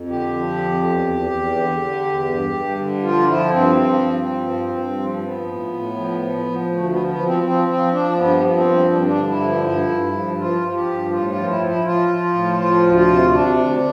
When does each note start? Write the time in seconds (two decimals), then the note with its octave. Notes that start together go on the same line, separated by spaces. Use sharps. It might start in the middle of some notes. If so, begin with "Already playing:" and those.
Already playing: F2
0.09 D3 G4
0.34 F3
0.58 F2
0.83 E2
1.07 E2
1.32 E2
1.56 D3
1.80 D3
2.05 E2
2.30 G2
2.53 G2
2.78 D3
3.02 F3 F4
3.21 D4
3.27 F3 E4
3.51 G2 C4
3.76 F3
4.01 G2
4.25 F3
4.49 G2
4.75 G2
4.99 F3
5.19 C4
5.23 F3 B3
5.47 A2
5.73 A2
5.97 F3
6.20 F3
6.46 F3
6.70 D2 A3
6.89 B3
6.95 F3
7.07 B3
7.18 F3
7.25 C4
7.43 F3 C4
7.67 F3 C4
7.92 F3 D4
8.17 G2 B3
8.42 F3 B3
8.54 C4
8.66 G2
8.90 G2 D4
8.97 C4
9.05 D4
9.15 D3
9.27 E4
9.40 F3
9.64 G2 E4
9.88 G2
10.13 F3
10.38 F3 F4
10.61 F3
10.68 F4
10.74 G4
10.86 G2
11.11 A2 F4
11.29 F4
11.35 F3
11.48 E4
11.59 F3
11.66 E4
11.84 F3 F4
12.09 F3
12.33 A2
12.57 F3 F4
12.82 D2
12.95 F4
13.07 C3
13.31 C3 D4
13.56 D2